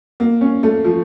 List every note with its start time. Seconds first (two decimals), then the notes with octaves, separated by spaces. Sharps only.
0.20 A#3
0.41 C#4
0.63 A3
0.85 F3